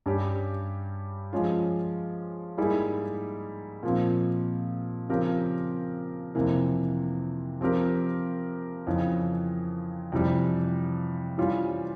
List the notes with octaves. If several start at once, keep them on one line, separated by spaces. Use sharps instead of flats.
G2 G3 C#4 G4
F3 G#3 C#4 F4
G#2 G3 A#3 E4 G#4
A#2 F3 C4
C#3 F3 C4 G4 A#4
F2 C3 E3 A#3
F3 C4 G4 A#4
F2 C#3 E3
F2 C3 E3 G3
E3 G3 C#4 F4